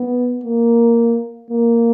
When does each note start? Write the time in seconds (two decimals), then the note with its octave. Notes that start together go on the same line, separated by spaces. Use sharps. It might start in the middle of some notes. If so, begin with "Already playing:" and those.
Already playing: B3
0.44 A#3
1.50 A#3